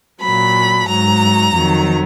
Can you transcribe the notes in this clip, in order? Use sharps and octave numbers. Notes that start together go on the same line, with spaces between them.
A#2 F#3 B5
G#2 F#3 A#5
F2 D#3 F#3